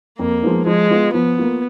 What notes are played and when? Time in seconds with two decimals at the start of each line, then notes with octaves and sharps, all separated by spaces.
0.19 F2 A#3
0.42 F3 G#3 B3 D#4
0.66 F3 G#3
0.90 B3 F4
1.14 F3 B3
1.38 A#3 F4